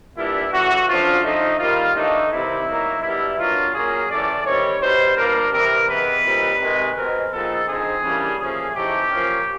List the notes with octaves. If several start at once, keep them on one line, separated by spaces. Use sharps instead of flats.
A#2 G3 B3 D4 E4
C#3 E3 A3 F#4
C#3 F3 A3 D4 F4
D3 F3 A3 D#4
D#3 G3 A#3 F4
A2 E3 A3 D4 D#4
C3 D#3 G3 C4 E4
A2 F#3 A#3 D#4
B2 G3 B3 D4 E4
B2 F#3 A#3 D4 F4
A#2 F#3 A#3 C#4 G#4
A2 E3 A3 C#4 D5
D#3 G3 C4 C#5
B2 G3 B3 D#4 C5
A#2 G3 A#3 D4 A#4
C3 E3 G3 C4 A#4
C3 E3 G#3 B3 B4
A#2 G3 C4 D#4
C3 D#3 G#3
B2 G#3 C4 A#4
A#2 F3 G#3 B3 D#4 A4
D3 F3 G#3 C4 D#4 G#4
C#3 E3 G3 A#3 D4
A#2 F3 A3 C#4 G#4
E3 A3 C4 D#4 G4
A#2 F3 A#3 C#4